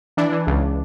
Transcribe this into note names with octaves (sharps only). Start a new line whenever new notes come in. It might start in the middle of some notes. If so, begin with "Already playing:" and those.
E3 D4
E3
C#2